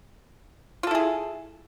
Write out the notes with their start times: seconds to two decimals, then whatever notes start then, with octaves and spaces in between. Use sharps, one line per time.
0.83 F4
0.87 A4
0.91 E4
0.95 G#4